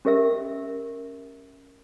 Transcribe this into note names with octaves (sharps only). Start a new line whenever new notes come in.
C#4 G4 A#4 E5 E6